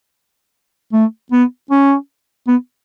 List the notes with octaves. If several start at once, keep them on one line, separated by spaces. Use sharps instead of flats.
A3
B3
C#4
B3